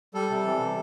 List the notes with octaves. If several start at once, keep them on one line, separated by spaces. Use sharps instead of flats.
G3 A4
C3
E3
C3